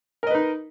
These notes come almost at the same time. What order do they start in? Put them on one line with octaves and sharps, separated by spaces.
A#4 D#5 B4 D#4